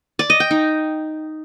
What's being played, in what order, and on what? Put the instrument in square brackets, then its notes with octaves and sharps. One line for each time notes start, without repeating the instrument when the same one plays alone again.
[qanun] D5
D#5
G5
D#4